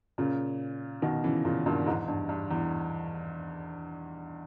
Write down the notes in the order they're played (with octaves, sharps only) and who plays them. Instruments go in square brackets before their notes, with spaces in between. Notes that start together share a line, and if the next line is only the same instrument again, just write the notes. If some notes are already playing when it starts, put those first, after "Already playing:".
[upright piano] A#2 C#3
B2 D#3
C#3 E3
A#2 C#3
G2 A#2
E2 G#2
G2
G2
E2